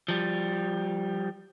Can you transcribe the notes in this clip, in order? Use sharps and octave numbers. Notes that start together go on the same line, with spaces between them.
F3 G3